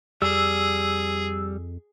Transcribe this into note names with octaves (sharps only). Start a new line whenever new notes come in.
F2 G3 G#4 E6